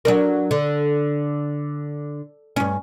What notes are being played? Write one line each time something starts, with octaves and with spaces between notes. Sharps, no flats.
F#3 D4 A#4
D3
G2 C#4